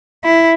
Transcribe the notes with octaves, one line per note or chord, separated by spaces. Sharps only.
E4